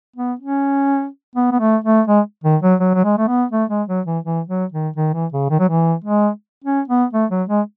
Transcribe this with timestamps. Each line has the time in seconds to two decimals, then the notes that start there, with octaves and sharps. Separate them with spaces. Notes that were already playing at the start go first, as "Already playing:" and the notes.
0.16 B3
0.39 C#4
1.35 B3
1.51 B3
1.60 A3
1.84 A3
2.07 G#3
2.44 D#3
2.62 F#3
2.80 F#3
2.94 F#3
3.04 G#3
3.18 A3
3.28 B3
3.52 A3
3.70 G#3
3.88 F#3
4.06 E3
4.24 E3
4.48 F#3
4.72 D#3
4.96 D#3
5.13 E3
5.32 C#3
5.50 D#3
5.59 F#3
5.68 E3
6.04 G#3
6.64 C#4
6.88 B3
7.13 A3
7.30 F#3
7.48 G#3